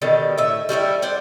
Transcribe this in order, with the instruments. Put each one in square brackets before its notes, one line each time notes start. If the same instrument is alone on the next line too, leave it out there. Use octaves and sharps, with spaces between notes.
[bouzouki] B2 D3 D#3 G3
A2 E5
G3 A3 D4 E4
C5 D5 F#5